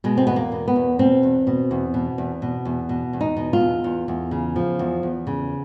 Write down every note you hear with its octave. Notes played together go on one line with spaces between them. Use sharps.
B2 G#3
C4
E2 B3
A#3
B2
B3
E2
B2 C4
E2
B2
E2
B2
E2
B2
E2
B2
E2
D#4
B2
F4
E2
E2
E2
C#3
F3
E2
E2
C#3